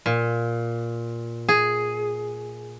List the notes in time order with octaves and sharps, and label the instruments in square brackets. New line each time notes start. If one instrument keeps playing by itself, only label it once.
[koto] A#2
G#4